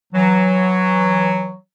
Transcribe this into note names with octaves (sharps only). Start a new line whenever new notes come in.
E3 F#3